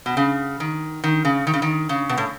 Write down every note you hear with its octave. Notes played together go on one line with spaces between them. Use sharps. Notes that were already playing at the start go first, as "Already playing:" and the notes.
B2
C#3
D#3
D#3
C#3
D#3
C#3
D#3
C#3
B2
A2